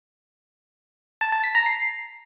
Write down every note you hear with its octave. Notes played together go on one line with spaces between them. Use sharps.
A5
A5
B6
A#5
C7